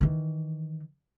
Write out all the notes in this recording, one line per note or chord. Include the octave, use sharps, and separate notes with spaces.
D#3 E3